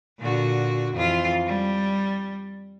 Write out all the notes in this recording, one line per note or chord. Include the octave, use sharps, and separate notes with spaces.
A#2 D3 F#4
F2 E3 F4
G3